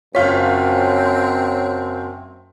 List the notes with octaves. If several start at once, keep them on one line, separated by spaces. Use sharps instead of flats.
F#1 F#2 C4 F4 C#5 B6